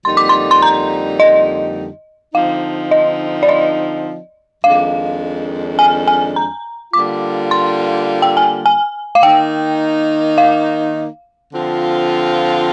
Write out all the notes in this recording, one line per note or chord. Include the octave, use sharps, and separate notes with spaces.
F2 D3 G3 A#3 D#4 C6
D6
C6
C6
A#5
D#5
D3 F3 C4 D#4 F5
D#5
D5
D#5
F2 D#3 G#3 D4 F5
G#5
G#5
A#5
D3 G3 A#3 F4 D6
C6
G5
G#5
G#5
F5
D#3 A#3 D#4 G5
F5
D3 F3 C4 F4